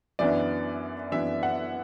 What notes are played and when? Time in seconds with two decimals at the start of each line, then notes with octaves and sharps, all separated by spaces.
0.19 F#2 E3 B3 D4 D5
1.12 F#2 E3 B3 D4 E5
1.43 F#5